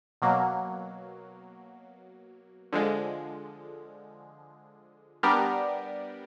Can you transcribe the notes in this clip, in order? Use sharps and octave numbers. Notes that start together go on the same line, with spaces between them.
B2 F#3 A#3
D3 F3 G#3
G3 B3 D4 G4 A#4